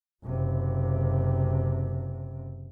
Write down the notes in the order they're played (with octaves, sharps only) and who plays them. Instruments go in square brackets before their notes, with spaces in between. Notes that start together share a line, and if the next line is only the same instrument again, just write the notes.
[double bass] F#1 C3